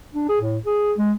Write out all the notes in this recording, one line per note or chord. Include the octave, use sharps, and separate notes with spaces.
D4
G#4
A2
G#4
G#3